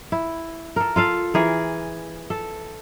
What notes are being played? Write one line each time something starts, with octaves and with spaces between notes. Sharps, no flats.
E4
A4 A#4
F4 A4 F5
E3 G#4 A#4
A4